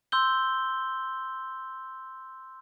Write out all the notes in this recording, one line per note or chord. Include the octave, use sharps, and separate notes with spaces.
C6 E6 G6 G7